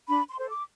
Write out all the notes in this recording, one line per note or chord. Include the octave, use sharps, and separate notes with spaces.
D4 B5
C6
A4 C5
D6